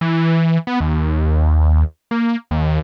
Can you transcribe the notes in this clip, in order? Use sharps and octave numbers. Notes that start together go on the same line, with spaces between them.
E3
B3
D#2
A#3
D#2